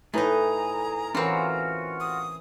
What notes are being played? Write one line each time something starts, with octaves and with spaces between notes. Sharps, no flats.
A2 A3 D#4 E4 G#4 B4 A#5
E3 C4 C#4 F4 F#4 A#4
D#6